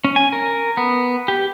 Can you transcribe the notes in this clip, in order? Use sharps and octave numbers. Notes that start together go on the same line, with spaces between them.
C#4
G#5
A#4
B3
G4